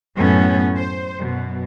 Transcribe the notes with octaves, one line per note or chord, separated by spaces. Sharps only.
F#2 A2 B3 C#4
C5
F#2 B2